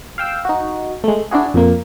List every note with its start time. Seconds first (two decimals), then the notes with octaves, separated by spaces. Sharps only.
0.18 F5 G5 E6
0.45 D#4 F#4
1.04 G#3 A3
1.31 D4 E4 F#4 G#4
1.54 F2 A#2 A#3